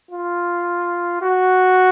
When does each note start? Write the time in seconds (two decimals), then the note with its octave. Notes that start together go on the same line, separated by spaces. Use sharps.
0.11 F4
1.22 F#4